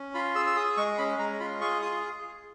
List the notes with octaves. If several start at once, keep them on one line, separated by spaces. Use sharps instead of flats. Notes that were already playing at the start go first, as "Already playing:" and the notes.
Already playing: C#4
F4 B5
G#4 E6
E6
G#4 D#6
G#3 C#6
C#4 B5
G#3 A#5
F4 B5
G#4 C#6
F4 D#6